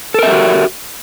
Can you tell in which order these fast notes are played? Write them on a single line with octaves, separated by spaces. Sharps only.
A4 A#4 E5 G4 F#4